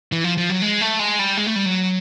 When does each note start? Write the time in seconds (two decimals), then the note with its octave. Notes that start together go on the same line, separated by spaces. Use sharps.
0.12 E3
0.24 F3
0.37 F3
0.50 F#3
0.62 G#3
0.81 A3
0.99 G#3
1.19 G3
1.37 G#3
1.47 A3
1.56 G3
1.66 F#3